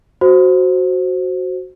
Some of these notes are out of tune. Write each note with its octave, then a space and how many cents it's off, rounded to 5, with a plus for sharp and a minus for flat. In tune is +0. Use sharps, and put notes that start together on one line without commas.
F#4 +0 C5 +0